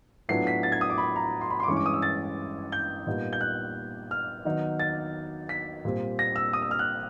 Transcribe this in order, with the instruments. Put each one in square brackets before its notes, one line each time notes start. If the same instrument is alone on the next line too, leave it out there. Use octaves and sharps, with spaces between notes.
[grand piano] A2 F#3 B3 D4 F4 C7
B6
A6
G#6
D#6
D6
B5
A#5
C6
B5
C6
D6
G2 E3 G#3 C#4 C#6
D6
D#6
E6
A6
G6
A#2 G3 B3 D#4
G6
F#6
F6
D#3 F#3 B3 D#4
A6
B6
A#2 G3 C4
A#6
E6
D#6
E6
F6
F#6